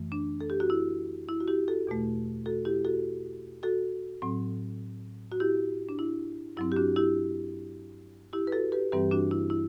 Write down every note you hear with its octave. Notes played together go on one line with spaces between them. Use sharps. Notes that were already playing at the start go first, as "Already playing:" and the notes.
Already playing: F#2 E3 A3
D4
A4
G4
F#4
E4
E4
F#4
E4 G4
F#4 A4
E2 B2 A3
F#4 A4
E4 G4
F#4 A4
F#4 A4
A2 F#3 C4
F#4
E4 G4
D4
E4
G2 F#3 C4 E4
G4
D4 F#4
E4 G4
E4 G4
B4
F#4 A4
G4 B4
G2 E3 G3 C4 G4 B4
D4 F#4
E4
E4